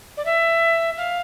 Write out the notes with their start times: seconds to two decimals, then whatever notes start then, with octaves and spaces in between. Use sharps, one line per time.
0.17 D5
0.25 E5
0.97 F5